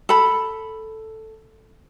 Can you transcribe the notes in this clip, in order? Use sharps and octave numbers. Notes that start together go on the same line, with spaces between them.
A4 B5